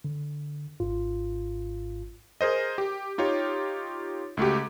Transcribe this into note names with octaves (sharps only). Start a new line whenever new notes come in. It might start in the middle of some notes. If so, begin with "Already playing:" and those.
D3
G#1 G#2 F4
G#4 A#4 C5 D#5
G4
D#4 F4 G4 C#5
C#2 A3 F#4 G4